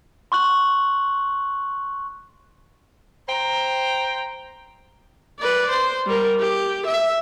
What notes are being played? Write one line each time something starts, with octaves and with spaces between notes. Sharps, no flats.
C6 C#6 F#6 F#7
C5 G5 A#5
B4 D5
C5
G3 A#4
G4
E5